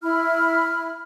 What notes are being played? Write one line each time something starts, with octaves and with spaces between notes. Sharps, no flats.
E4 B5 F6